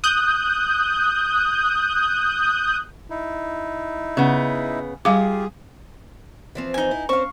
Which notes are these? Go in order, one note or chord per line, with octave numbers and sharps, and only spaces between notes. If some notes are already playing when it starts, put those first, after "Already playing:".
D#6 F#6 G6
D#4 E4
C#3 B3
G3 F4 G4 G#4 F5 D6
E3 F3 C4
D#4 G#5
E4
C4 C#4 C5 F5 C#6